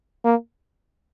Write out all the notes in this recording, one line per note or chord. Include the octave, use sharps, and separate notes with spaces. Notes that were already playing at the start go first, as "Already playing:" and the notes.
A#3